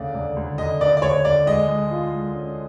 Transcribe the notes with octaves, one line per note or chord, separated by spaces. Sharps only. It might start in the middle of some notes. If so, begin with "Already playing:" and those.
Already playing: D2 C#3 D5
D2
D2
D2 D#5
D2 D5
D5
D2 C#5
D2 D5
G#3 D#5
G#3
F4
G#3
C#4